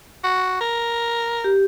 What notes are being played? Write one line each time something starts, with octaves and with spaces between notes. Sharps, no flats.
F#4
A#4
G4